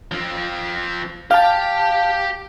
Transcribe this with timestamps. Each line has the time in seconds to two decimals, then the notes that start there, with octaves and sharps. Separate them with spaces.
0.12 F3 C4
1.31 G4 F5 G5 A5